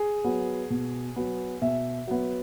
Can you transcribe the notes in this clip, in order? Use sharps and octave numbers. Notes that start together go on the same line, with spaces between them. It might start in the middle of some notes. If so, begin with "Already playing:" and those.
Already playing: G#4
F#3 B3
B2
F#3 B3
B2 E5
F#3 B3